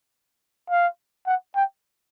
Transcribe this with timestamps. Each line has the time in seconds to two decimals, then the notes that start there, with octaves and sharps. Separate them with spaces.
0.70 F5
1.27 F#5
1.55 G5